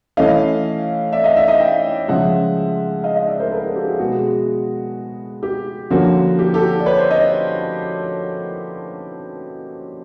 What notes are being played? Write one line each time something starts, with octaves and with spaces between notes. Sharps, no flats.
E3 A3 C#4 D#5 F5
D5 E5
D#5 F5
D5 E5
D#5 F5
F5 G5
C#3 F3 G#3 E5 F#5
D#5 F5
D#5 F5
D5 E5
A#4 C5
A4 B4
G#4 A#4
G4 A4
F#4 G#4
B2 G#3 B3 F#4 G#4
G4
D3 F3 A#3 C#4 F#4
G4
G4 A4
D5
B4 C#5
C5 D5
C#5 D#5